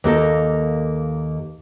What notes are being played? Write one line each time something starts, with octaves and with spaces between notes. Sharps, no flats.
D#2 A#3 A4 A#4